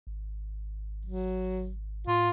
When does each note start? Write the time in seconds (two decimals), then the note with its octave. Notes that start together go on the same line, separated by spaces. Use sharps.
0.07 G#1
1.05 F#3
2.07 A2 F4